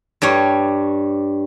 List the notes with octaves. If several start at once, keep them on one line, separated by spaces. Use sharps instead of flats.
G2 G3 C#5